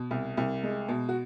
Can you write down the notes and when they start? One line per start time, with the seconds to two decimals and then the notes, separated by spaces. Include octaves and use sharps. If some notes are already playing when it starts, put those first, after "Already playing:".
Already playing: B2
0.11 C2
0.37 C2
0.63 G#3
0.89 B2
1.09 F#4